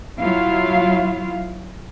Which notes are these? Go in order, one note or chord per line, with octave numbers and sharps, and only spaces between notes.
F#3 E4 F4 F5